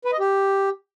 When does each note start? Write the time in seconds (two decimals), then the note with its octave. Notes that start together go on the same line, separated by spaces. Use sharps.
0.05 B4
0.12 D#5
0.20 G4